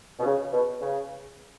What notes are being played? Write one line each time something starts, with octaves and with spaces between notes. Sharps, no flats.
B2
C#3
B2
C#3